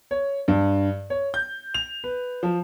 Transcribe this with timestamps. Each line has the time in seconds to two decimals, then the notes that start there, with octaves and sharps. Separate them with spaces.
0.11 C#5
0.48 G2
1.10 C#5
1.34 G6
1.74 F7
2.04 B4
2.43 F3